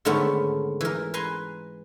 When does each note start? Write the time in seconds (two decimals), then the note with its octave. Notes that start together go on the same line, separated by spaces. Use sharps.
0.05 G#2 D3 D#3 A3 B3 C#4
0.81 E3 A#4
1.14 B4 G#5 A#5 C6